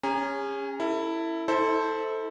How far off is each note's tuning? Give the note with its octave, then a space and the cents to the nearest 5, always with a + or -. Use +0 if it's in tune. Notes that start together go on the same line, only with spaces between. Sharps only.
C#4 +0 G#4 -40 A#5 +0
E4 +0 A4 +35
E4 -40 A4 +0 C5 +0